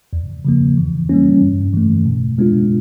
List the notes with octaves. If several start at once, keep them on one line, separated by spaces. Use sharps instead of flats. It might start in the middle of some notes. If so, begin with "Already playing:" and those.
E2
C#3 F3 A#3
E3
G3 A#3 C#4
G2
E3 A3
B2
G#3 B3 D4 F4